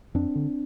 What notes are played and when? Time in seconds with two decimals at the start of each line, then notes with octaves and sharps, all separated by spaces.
0.14 F2 C4 D4
0.35 D3